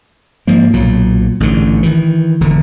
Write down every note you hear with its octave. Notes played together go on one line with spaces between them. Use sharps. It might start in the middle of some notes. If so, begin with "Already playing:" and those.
G#2 F3 A#3
B1 A#2 F#3
A1 G#2 D3
D#3 E3
E1 D3